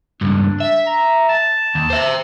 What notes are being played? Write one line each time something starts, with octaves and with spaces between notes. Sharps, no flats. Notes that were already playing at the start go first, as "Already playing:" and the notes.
C#2 G2 D4
E5
A#5
A5
D#2
C5 E5